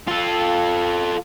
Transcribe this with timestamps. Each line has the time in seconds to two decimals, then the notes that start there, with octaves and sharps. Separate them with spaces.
0.08 F4 A4